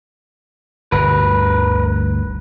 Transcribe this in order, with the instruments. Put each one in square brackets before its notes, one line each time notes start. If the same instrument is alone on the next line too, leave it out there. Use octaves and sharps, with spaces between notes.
[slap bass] G1 D2 G2 [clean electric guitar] A#4 B4